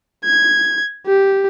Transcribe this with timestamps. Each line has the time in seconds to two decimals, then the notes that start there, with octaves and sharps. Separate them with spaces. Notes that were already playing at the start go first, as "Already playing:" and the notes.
0.24 G#6
1.06 G4